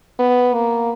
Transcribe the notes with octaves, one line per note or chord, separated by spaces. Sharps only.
B3
A#3